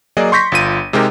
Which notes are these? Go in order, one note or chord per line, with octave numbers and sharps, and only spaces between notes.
F#3 A#3 G#4 D5 D#5
C6 C#6 G6 A#6 B6
G1 F4 D#7
C3 G#3 D#4 G4 A#4